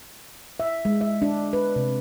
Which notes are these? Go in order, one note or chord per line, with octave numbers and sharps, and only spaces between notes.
E5
G#3
E5
D4
B4
C3